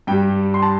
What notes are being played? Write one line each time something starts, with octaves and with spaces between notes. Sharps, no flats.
G2 G3 G5
C6
A5